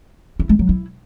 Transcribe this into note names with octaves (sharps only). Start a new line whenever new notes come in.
E4
G#3
F#3
E4